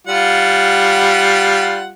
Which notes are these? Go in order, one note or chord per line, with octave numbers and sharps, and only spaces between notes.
G3 F4 F#5